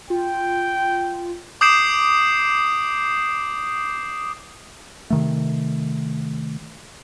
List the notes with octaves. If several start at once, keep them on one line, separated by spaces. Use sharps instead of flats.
F4 G5
D6 D#6 G6 C7 D7 E7
C3 D#3 A3